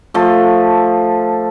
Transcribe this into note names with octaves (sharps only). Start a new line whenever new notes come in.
F3 A3